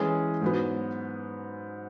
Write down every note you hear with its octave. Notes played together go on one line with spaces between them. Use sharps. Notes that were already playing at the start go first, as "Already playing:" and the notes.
Already playing: E3 G#3 C#4 G#4
G#2 F#3 B3